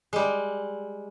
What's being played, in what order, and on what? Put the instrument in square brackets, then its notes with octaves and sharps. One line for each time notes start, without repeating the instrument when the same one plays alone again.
[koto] G3 G#3